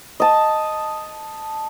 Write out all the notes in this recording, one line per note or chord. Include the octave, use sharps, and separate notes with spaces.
D#5 A5